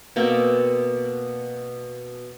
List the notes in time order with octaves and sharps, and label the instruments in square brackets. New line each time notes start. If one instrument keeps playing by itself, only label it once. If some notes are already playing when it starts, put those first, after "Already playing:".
[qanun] B2 A#3 C4